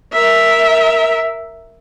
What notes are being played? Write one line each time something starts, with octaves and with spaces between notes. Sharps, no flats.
A#4 E5